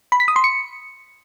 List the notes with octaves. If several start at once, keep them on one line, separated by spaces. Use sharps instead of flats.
B5
B6
D#6
C6
C#7